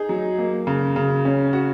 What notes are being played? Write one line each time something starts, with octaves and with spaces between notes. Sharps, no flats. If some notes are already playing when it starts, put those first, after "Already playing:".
Already playing: D#4 G#4
F#3
A#3
C#3
C#3
C#4
F#4